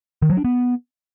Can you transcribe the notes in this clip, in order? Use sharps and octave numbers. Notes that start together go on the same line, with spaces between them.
D#3
F#3
D4
B3